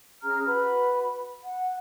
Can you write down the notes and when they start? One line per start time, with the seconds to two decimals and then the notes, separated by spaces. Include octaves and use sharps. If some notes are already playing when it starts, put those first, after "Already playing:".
0.22 C#4 G#4 A#5 F6
0.45 F#4 B4 B5
1.42 F#5